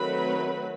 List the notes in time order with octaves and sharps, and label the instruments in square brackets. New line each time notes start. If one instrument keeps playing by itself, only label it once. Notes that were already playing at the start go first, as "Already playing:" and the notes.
Already playing: [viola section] D#3 F#3 A3 C4 B4 B5